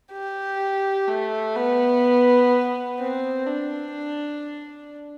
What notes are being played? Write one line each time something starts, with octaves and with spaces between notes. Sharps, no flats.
G4
A3
B3
C4
D4